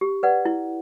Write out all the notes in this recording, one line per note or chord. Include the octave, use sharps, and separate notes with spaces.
G4
B4 D5 F#5
E4